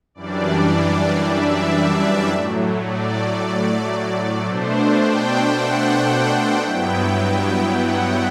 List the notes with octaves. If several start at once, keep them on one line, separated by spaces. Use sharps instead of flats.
F#2 E3 G3 D4 D5
E5
A2 F#3 A3
D5
B2 A3 D4 C5
G5
F#5
G2 F#3 B3 E4 G5
F#5